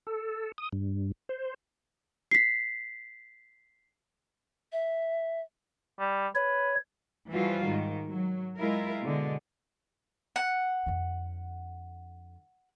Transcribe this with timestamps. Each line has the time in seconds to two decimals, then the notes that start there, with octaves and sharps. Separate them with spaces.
0.07 A4
0.58 D#6
0.73 G2
1.29 C5
2.31 B6 C7
4.72 E5
5.99 G3
6.35 B4 C#5
7.32 E3 F3 G3 F4 F#4
7.66 G#2 D#3
8.09 F#3
8.59 G#3 E4 F4 A#4
9.02 B2 D3 G#3
10.36 F#5
10.86 F2 D3